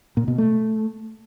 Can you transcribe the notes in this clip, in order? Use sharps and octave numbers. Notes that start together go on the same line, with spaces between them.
A#2
B2
A3